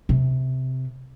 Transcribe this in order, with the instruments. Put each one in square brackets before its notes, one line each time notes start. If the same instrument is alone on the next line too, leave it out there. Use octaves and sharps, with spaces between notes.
[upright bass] C3